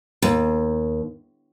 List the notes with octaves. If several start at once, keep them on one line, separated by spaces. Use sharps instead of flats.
D#2